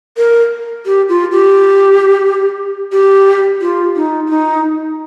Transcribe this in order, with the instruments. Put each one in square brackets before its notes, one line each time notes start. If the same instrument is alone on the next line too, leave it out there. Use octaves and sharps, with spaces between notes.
[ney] A#4
G4
F4
G4
G4
F4
D#4
F4
D#4